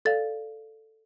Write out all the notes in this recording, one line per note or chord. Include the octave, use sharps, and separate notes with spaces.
A4 D5 F5 A6